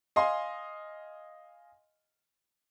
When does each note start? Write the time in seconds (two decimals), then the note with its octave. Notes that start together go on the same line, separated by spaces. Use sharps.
0.16 D#5 F5 G#5 C6